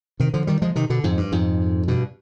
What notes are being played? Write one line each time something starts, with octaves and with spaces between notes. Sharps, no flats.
C3 D#3
D3 F3
D#3 G3
F3 G#3
C3 D#3
B2 D3
F2 G#2
G2
F2 G#2
G2 B2